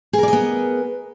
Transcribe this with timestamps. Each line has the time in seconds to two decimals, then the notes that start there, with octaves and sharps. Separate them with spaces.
0.13 G#4
0.18 A#4
0.23 D5
0.28 D#5
0.33 B3